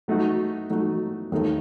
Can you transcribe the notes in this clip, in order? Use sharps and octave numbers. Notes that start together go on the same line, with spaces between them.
F#3 A3 D#4 F#4
F#3 A3 D#4 F#4
D#2 D#3 A3 D#4 A4